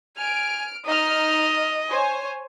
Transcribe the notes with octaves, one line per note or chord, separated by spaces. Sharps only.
G#5 F6 D7
D#4 D#5 F6
C5 C#5 G#5